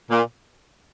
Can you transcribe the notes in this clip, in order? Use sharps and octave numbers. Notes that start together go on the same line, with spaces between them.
A#2